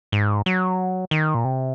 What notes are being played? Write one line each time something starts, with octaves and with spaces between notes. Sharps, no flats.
G#2
F#3
D#3
A#2
C3